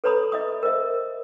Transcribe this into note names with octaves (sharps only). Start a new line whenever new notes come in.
A4 B4 C#5 A#5 B5 D#6
D#5 E5 D#6
A#4 C5 D#5 E5